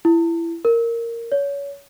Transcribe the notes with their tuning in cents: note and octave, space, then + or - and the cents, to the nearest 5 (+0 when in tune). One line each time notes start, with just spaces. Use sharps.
E4 +20
A#4 -10
C#5 +25